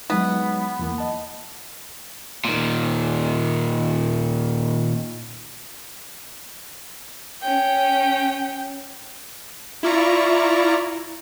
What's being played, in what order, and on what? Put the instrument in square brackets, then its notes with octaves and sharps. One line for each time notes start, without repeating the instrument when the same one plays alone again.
[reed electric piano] F#3 G#3 D#4 [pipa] B3
[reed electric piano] E2 E3 A#3
D#5 A5
[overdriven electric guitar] A#2 D#3
[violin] C#4 G5
[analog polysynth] E4 F4 D5 A#5 C#6